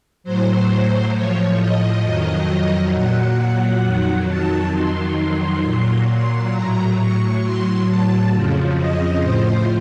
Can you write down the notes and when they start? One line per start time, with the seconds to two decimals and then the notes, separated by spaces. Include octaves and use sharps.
0.24 A2 F#3 C5
1.13 A2 F3 C#5
1.58 D#5
2.04 F2 D#3 F#3
2.93 A#2 F#3 F#5
3.83 F2 D#3 F#3
4.28 A5
4.72 F2 D#3 F#3 C6
5.17 C6
5.63 A#2 F#3
6.08 C6
6.52 A2 F#3 A#5
6.98 C#6
7.42 A2 F#3 C6
7.87 A5
8.32 F2 C#3 F3
8.77 D#5
9.21 A2 F3 C5